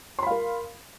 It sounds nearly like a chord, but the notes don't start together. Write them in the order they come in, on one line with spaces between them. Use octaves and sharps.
C6 B5 F5 A#4